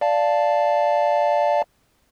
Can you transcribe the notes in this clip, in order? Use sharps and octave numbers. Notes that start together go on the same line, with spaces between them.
D5 F5 A5